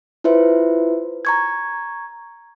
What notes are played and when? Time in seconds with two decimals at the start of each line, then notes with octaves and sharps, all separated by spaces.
0.24 E4 F4 B4 C5 E5
1.25 A#5 C#6 G#6